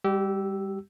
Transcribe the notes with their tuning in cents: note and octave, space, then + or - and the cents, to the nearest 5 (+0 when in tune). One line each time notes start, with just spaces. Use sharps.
G3 +30 G4 -25 E6 +0